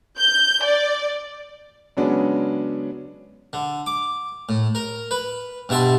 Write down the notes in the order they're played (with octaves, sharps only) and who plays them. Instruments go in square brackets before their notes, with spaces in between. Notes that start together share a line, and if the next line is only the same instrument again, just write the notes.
[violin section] G6
D5
[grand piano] C#3 F#3 G#3 B3 C#4 D4
[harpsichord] D3
D6
A2
A#4
B4
G2 B2 E5 A5 C6